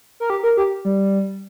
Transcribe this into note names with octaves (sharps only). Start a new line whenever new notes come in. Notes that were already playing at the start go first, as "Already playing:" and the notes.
A#4
G4
A#4
G4
G3